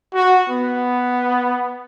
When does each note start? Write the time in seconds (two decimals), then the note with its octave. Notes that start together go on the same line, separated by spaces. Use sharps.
0.14 F#4
0.50 B3